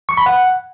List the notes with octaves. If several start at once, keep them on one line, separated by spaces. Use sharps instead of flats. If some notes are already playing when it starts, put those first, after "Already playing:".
C#6
B5
F#5